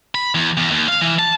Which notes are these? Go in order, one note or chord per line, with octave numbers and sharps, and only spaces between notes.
B5
E2
E2
D#2
F5
E3
A5